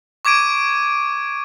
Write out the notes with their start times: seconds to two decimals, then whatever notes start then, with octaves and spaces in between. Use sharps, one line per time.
0.25 C#6 D6 G#6 D7 D#7